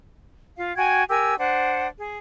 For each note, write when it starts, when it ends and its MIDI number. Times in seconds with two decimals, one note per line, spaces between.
0.57 0.74 65
0.57 0.74 77
0.76 1.03 66
0.76 1.03 79
0.76 1.03 80
0.76 1.03 92
1.09 1.35 67
1.09 1.35 70
1.09 1.35 80
1.09 1.35 88
1.38 1.88 62
1.38 1.88 72
1.38 1.88 78
1.98 2.18 68